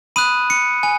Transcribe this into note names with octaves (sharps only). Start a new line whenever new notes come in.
B5 D#6 F#6 D#7
C#7
G#5